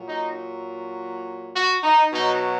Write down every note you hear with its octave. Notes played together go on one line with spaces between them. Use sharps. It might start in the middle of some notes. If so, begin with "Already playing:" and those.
Already playing: A#2 F#3
D#4
F#4
D#4
B2 F#3 D#4